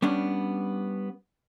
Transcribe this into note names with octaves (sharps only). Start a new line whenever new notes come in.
G3 B3 C#4 D4